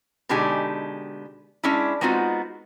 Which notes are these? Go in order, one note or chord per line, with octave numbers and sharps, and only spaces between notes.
B2 D3 G#3 D#4 G4 G#5
G#3 C#4 D4 E4
G#3 B3 C4 D#4 F4 F#4